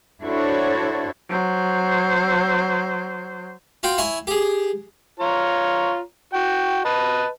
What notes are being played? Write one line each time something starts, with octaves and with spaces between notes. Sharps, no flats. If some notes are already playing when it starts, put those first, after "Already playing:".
D4 E4 F#4 A4 C5 C#5
F#3 C5
F4 F#4 G5
E4 C#5 G#5
G4 G#4
F4 C#5 A#5
F#4 G5
B4 D#5 A5